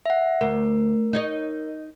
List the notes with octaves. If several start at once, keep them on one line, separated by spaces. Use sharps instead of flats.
E5 F#5
D2 A#4
D#4 C#5 D#5